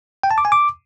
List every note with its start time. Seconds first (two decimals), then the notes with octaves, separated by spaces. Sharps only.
0.23 G5
0.31 A5
0.38 D6
0.45 G#5
0.52 D6